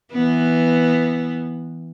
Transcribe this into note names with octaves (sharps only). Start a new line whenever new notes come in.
E3 B3